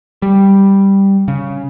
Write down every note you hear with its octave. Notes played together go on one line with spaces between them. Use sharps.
G3
C#3